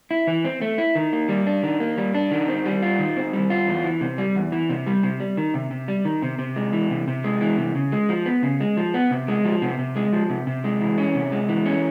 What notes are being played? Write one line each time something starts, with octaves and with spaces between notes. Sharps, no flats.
E4
E3
C4
A3
E4
D#3
A#3
G3
D4
D#3
A#3
G3
D4
D#3
C4
G3
F4
D#3
C4
G3
F4
E2
E3
C3
G3
E2
E3
C3
G3
C3
G3
D#3
C3
C3
G3
D#3
C3
C3
G#3
E3
C3
C3
G#3
E3
C3
C#3
G#3
F3
B3
C#3
G#3
F3
B3
C3
G#3
F3
C3
C3
G#3
F3
C3
C3
G#3
E3
C#4
C3
G#3
E3
C#4